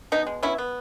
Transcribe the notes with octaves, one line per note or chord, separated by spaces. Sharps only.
B2 D#4
G#3
B3 C#4 E4
B3